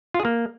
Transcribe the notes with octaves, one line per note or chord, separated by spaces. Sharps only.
F4
G#4
A#3